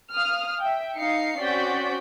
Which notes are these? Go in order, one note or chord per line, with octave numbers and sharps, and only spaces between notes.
F5 D#6 F6
E5 G5
D#4 F5 C7 C#7
C4 C#4 F#4 D5 G6 B6